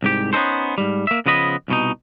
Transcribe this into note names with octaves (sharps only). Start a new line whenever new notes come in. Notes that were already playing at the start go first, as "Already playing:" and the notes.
C2 G#2 G4
B3 C#4 D#4 A4 C5
G#2 G3
A#3 E5
C#3 F3 B3 D#5 B5
C2 B2 D#4